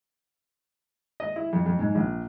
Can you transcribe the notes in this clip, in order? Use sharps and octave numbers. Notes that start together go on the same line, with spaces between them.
D#5
E4
F2
F2
G#2
A#1